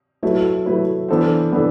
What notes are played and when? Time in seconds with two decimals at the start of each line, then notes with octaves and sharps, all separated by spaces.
0.23 F#3 A3 E4 B4
0.66 F#3 A3 E4 B4
1.08 E3 B3 D4 A4 C5
1.52 E3 B3 D4 A4